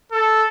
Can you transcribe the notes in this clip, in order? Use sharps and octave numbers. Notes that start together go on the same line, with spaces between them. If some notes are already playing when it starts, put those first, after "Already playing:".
A4